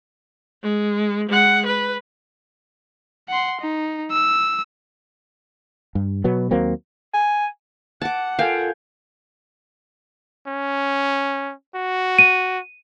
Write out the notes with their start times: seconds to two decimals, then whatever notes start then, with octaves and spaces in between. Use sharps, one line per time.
0.63 G#3
1.29 G#3 F#5
1.65 B4
3.28 F#5 C6
3.61 D#4
4.12 E6
5.95 G2
6.24 B2 F#3 B3
6.51 D#2 F#3 A#3 C4
7.14 G#5
8.02 F#5 A5 D6
8.39 F4 A4 A#4 F5 G5 G#5
10.48 C#4
11.75 F#4
12.19 D#7